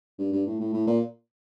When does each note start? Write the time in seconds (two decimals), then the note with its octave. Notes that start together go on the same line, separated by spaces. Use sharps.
0.19 G2
0.32 G2
0.46 A2
0.60 A2
0.73 A2
0.87 A#2